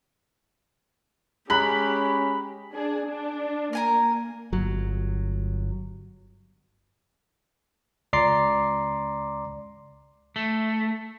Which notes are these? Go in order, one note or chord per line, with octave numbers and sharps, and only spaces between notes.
G#3 C#4 G4 A#5 B5 F#6
D4 G#4
D4
A#3 A#4 G#5 A#5
G1 F#3
C#2 D5 A#5 C6 D6 C7
A3